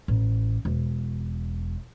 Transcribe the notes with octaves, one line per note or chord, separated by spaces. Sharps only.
A1
E1